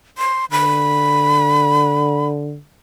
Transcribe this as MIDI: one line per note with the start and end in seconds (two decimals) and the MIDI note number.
0.18 0.45 84
0.51 2.59 50
0.51 2.26 83